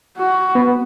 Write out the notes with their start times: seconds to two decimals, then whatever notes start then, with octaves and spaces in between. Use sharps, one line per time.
0.18 F#4
0.55 B3